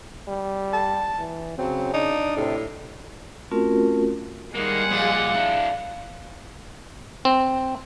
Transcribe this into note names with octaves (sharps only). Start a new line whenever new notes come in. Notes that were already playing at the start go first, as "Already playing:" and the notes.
G3
A5
E3
C#3 F#3 C4
D4 D#4
A2 C3
A3 C4 C#4 F4 F#4 A#4
G3 G#3 A#3 D#4 G#4 F#5
A#2 F3
D4 E4
C4